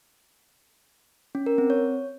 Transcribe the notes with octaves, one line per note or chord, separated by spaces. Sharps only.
C#4
A#4
C4
C#5